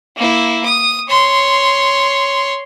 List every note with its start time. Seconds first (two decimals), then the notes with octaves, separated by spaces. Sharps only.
0.16 A#3 E4
0.65 D#6
1.08 C#5 C6